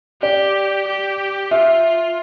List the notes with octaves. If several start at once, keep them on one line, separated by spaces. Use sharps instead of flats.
G4 D5
G4
F4 E5